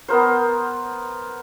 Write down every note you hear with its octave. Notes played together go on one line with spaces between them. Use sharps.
B3 A#4 C5